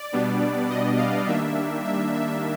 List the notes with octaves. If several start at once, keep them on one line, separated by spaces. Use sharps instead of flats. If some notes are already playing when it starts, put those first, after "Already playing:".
Already playing: D5
B2 G3 B3 D4
D#5
F5
D#3 G3 A#3 D4 E5
E5
E5